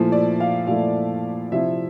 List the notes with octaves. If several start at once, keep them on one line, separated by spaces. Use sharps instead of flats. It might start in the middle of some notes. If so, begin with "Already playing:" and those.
Already playing: A#2 F3 A3 E4
D5
F5
A#2 F3 A3 E4 F5
C3 F3 C4 E4 E5